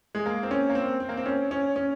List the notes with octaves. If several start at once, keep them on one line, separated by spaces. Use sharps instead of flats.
G#3
A#3
C4
C#4
A#3
C4
C4
A#3
C4
C#4
C#4
C#4